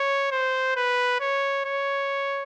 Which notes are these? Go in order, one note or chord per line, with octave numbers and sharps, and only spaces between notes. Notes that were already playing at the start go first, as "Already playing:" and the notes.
Already playing: C#5
C5
B4
C#5
C#5